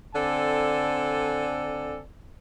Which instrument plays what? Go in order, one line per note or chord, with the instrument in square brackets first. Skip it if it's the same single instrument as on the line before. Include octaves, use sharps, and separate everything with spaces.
[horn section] D3 C4 A4 D5 G#5